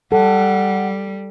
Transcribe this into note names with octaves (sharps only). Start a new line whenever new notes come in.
G3 A4 F#5